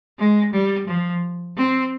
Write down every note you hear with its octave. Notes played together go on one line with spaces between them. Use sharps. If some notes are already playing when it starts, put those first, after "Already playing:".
G#3
G3
F3
C4